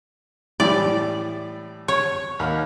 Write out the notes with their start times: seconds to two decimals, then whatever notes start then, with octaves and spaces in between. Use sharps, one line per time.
0.60 A2 E3 G3 D5
1.88 C#5
2.39 D#2 B5 F6